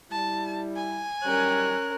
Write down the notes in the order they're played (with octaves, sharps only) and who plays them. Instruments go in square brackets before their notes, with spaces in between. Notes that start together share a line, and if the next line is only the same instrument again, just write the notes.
[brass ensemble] G3 E4 [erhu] A5
[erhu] G#5
[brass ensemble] F#2 D#3 G3 [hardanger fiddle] C#4 A#4 [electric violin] F#6